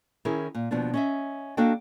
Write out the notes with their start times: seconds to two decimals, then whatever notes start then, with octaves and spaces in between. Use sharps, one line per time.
0.25 D#3 C#4 E4 G#4 A#4
0.55 A#2
0.71 D#2 B2 F3 B3 D4
0.94 C#4 D#5 E5
1.57 A#3 D4 F#4 A4 D#5 G5